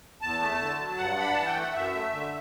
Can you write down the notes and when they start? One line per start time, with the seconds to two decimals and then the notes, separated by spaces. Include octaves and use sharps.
0.22 E2 A5
0.41 A3
0.59 D3
0.79 F#3
0.97 G2 F#5
1.16 D4 B5
1.32 E3 A5
1.46 G5
1.55 A3
1.60 F#5
1.73 F#2 E5
1.93 A3
2.12 D3